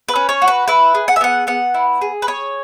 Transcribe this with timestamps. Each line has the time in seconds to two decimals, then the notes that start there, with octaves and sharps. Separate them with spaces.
0.09 B4
0.16 C#4
0.29 C#5
0.42 F#4
0.48 B4
0.68 E4 B4
0.95 G#4
1.08 F#5
1.16 E5
1.21 B3 F#5
1.47 B3 F#5
1.74 E4
2.01 G#4
2.22 B4
2.27 G#4 C#5